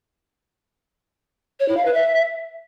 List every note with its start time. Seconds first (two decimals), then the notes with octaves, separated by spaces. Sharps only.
1.60 C#5
1.68 E4
1.77 F5
1.85 B4
1.94 E5